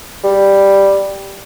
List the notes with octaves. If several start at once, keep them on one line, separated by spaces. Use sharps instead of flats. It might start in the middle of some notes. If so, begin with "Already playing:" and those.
G3